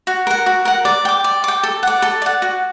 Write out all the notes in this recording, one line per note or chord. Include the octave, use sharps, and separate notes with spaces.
F#4
A#4 F#5
F#4
A#4 F#5
D5
G5 D6
D5
G5 D6
A4
D5 F#5
A4
D5 F#5
F#4